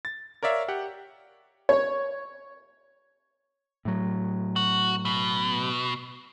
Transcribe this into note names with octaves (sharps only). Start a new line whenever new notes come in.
A6
A#4 C#5 D5 E5 F5
G4 F#5
C#5
A2 F#3
F#4
B2